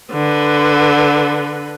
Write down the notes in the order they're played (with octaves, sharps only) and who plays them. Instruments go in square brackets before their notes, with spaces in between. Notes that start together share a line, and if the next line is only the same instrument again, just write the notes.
[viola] D3 B4